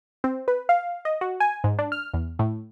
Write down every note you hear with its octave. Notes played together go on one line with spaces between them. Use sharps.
C4
B4
F5
D#5
F#4
G#5
G#2
D4
F6
E2
A2